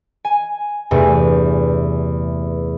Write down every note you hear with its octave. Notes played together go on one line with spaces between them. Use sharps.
G#5
E2 G2 C3 A3